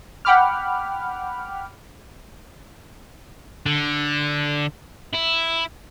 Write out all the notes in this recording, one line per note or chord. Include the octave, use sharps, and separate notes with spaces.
F#5 G5 B5 D6 F6
D3
E4